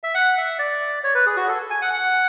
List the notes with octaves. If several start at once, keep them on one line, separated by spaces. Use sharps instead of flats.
E5
F#5
E5
D5
C#5
B4
G#4
F#4
A4
G#5
F#5
F#5